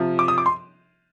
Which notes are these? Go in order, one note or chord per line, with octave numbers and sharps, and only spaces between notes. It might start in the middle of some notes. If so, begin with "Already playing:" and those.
Already playing: C3 F3
D6
D#6
D6
C6